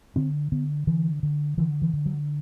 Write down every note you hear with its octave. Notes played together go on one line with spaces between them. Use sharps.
D3 C4
D3 B3
D3 E3
D3
D3 E3
E3
D3
F#3